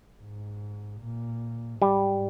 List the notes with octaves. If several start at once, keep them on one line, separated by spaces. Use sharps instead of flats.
G#2
A#2
G#2 G3